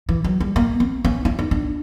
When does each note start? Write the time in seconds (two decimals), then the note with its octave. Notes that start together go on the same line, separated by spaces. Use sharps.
0.09 E3
0.24 F#3
0.40 G3
0.56 A#3
0.80 C4
1.05 C#4
1.25 E4
1.39 D#4
1.51 D4